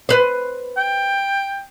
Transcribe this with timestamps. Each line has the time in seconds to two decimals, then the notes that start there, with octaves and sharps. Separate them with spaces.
0.09 B4 C5
0.77 G5